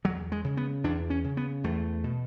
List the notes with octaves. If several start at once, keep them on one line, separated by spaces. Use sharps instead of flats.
E2 F#3
G#3
C#3
B3
E2 D4
C#4
C#3
B3
E2 A3
B2